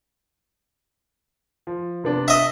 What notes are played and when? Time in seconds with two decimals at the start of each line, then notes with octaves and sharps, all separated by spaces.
1.67 F3
2.04 C3 B3 D4
2.28 D#5 E5